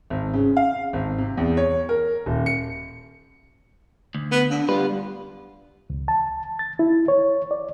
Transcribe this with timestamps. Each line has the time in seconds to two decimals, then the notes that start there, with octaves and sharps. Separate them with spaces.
0.10 G#1
0.34 C#3
0.57 F5
0.93 G#1
1.18 C3
1.37 E2
1.57 C#5
1.89 A#4
2.26 D#1
2.46 C#7
4.15 D2
4.32 B3
4.50 D3
4.69 G3 B3 F4 B4
5.90 C#2
6.08 A5
6.59 A6
6.79 E4
7.08 C#5
7.51 D5